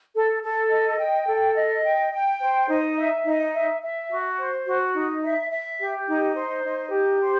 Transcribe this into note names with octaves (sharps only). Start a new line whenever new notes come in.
A4
A4
D#5
G5
A4
D#5
G5
G5
C5
D#4
E5
D#4
E5
E5
F#4
C5
F#4
D#4
E5
E5
G4
D#4
C5
D#4
G4
C5